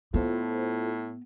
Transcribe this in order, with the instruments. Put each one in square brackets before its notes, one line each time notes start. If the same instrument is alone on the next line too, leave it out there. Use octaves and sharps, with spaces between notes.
[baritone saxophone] A2 [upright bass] B3 [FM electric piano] F4 A4 C5